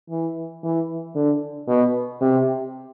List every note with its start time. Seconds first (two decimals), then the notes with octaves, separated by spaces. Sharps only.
0.10 E3
0.64 E3
1.15 D3
1.68 B2
2.21 C3